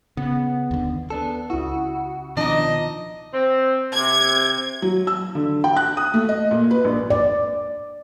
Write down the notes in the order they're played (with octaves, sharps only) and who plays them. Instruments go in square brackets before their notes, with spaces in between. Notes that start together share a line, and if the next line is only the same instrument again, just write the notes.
[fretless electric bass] C#3 [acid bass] B3
[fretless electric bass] D#2 D3
[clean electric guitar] B3 D4 A4
[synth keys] C#2 E4 [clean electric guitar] F#4
[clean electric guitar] B2 D#3 F3 [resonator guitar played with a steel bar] D4 D#4 [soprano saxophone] D#5
[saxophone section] C4
[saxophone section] C3 [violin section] G#6
[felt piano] F#3
E6
D3
G5
F#6
D#6
A3
D#5
A#2
B4
A#1
[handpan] D5